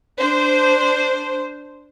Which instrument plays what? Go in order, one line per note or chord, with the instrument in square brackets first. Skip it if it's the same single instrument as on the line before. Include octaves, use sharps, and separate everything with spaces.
[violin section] D4 C5